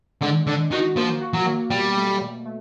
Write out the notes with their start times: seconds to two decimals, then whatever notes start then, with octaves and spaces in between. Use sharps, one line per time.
0.21 D3 G#3
0.47 D3 D4
0.71 D#3 F#4
0.96 F3 A#3
1.21 F#4
1.34 F#3
1.46 A#3
1.71 B2 G3
1.96 A3
2.21 B2
2.45 A3